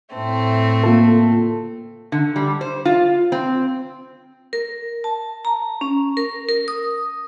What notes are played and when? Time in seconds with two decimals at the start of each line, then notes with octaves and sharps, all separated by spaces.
0.15 A2 A3 C4
0.84 A#3 F4 A4
2.12 D3
2.36 G3
2.61 C5
2.85 F4
3.32 C4
4.53 A#4
5.04 A5
5.45 A#5
5.81 C#4
6.17 A#4
6.49 A#4
6.68 D#6